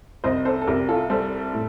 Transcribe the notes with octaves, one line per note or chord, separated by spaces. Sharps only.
C2 C5 D#5
A4 C5
A4
C2 G4 A#4
F4 A4
G3 A4 C5
A2